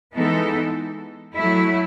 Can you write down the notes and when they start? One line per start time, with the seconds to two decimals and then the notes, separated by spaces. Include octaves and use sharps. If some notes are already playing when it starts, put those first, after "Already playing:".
0.13 E3 G#3 B3 D#4 A4
1.34 F#3 A3 E4